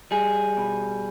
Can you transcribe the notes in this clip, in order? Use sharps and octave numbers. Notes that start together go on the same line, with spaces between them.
G3 G#4
B2